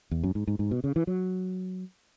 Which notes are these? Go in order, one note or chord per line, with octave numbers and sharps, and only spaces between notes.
E2
F#2
G#2
G#2
G#2
B2
C#3
E3
F#3